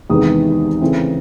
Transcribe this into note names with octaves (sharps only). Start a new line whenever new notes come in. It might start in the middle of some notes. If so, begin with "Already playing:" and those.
E2 C3 D#3 G#3 B3 D#6
C#3 E3 A3 C4